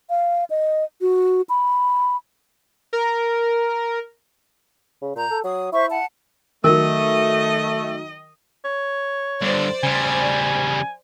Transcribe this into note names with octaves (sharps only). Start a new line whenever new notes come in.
F5
D#5
F#4
B5
A#4
C#3
A#2 A#5 G6
A4
F#3 D#6
E4 C5 E5 C#6
F#5 A5
D#3 F#3 A3 A#4 D#5
C#5
G2 D3 C5 D5
C#3 G3 G#5